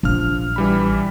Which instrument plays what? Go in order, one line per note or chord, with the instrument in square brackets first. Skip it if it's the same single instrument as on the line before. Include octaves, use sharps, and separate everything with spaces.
[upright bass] A#1 [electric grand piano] F3 F6
[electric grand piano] E3 G3 B5